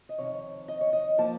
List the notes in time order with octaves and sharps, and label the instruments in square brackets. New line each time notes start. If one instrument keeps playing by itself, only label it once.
[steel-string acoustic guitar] D#5
F2 C3 D#3 C#5
D#5
C#5
D#5
F3 A#3 A5